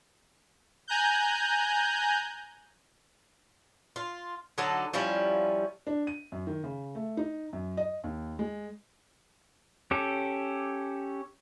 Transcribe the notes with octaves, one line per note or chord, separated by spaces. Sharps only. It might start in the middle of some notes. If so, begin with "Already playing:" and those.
G#5 A#5 F#6 G6
F4
D3 F#3 D#4 A4
F3 G3 C#4 E4
D4
D#7
F#2
D#3
C#3
A3
D#4
F#2
D#5
D#2
G#3
C#4 G4 A4